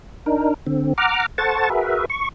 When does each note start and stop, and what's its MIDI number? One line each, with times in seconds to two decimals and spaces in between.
0.26 0.54 62
0.26 0.54 63
0.26 0.54 70
0.67 0.93 50
0.67 0.93 60
0.98 1.26 78
0.98 1.26 82
0.98 1.26 86
0.98 1.26 89
1.38 1.69 69
1.38 1.69 72
1.38 1.69 78
1.38 1.69 81
1.38 1.69 85
1.38 1.69 93
1.70 2.05 66
1.70 2.05 68
1.70 2.05 70
1.70 2.05 71
1.70 2.05 76
2.10 2.29 85